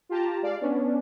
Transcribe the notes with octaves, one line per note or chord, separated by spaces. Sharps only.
F4 G4 A5 A#5
G#3 D5 F5
B3 C#4 D4